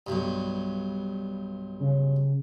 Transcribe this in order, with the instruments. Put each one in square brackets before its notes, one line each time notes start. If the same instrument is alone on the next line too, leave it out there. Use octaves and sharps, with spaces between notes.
[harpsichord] B1 G2
[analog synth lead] C#3